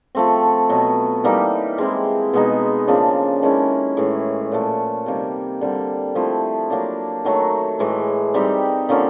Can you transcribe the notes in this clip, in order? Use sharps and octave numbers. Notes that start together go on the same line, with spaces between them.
F3 A3 C4
B2 F#3 B3
E3 G3 A#3 D#4
G#3 C4 E4
B2 G#3 B3 D#4
C#3 F3 A#3 D4
D#3 G#3 C#4 E4
A2 E3 G#3
A#2 F3 A3
C3 D#3 G3 A#3
D3 G3 C4
F3 A3 C4 E4
F#3 A#3 D4
D#3 F#3 A3
A2 E3 G#3
G3 C4 D#4 G4
D3 F3 A#3 C#4